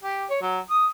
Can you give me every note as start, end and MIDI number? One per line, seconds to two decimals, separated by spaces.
0.03 0.25 67
0.30 0.37 73
0.41 0.59 54
0.71 0.87 87